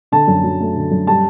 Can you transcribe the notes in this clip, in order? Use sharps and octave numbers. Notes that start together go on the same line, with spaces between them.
D3 A5
F#2
F#3
A3
D3
F#2
G3 A5